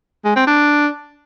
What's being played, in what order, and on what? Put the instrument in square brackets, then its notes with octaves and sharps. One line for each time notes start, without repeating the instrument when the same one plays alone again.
[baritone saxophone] G#3
C4
D4